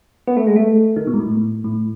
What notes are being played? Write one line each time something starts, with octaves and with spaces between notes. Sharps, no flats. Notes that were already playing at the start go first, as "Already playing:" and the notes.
B3
A3
G#3
A3
D#3
B2
G#2
A2
A2